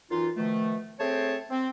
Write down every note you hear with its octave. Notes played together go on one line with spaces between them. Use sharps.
F#2 E3 D#4 F4
B2 D#3 F3 A3
A3 C4 G#4 C5 C#5 A5
C4